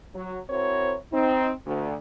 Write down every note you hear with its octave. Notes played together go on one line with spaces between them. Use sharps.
F#3
C4 E4 F#4 A#4 C5 C#5
C4 D#4
D2